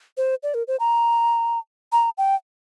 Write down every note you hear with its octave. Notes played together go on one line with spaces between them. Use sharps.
C5
D5
A#4
C5
A#5
A#5
G5